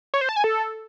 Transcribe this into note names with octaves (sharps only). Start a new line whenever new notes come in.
C#5
C5
A5
G#5
A4